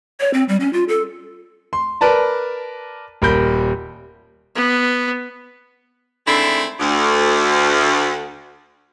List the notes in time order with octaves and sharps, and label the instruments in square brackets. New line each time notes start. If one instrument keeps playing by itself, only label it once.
[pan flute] C#5
C4
G3
C#4
F4
A4
[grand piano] C6
A#4 B4 D5 A5 A#5
D#1 A#4 B5 G6
[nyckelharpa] B3
[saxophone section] D3 D#3 G#3 A3 C4 E4
D2